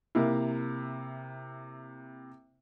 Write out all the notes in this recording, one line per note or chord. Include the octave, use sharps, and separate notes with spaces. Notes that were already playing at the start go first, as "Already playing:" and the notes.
C3 A#3 E4